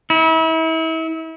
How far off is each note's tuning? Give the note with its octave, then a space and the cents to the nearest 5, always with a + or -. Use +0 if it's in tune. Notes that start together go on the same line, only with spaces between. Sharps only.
E4 -35